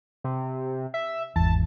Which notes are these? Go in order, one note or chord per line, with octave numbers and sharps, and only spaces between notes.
C3
E5
G#1 E2 A5